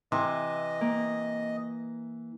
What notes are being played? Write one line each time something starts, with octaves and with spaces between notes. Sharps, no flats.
C3 E3 D#5
A#3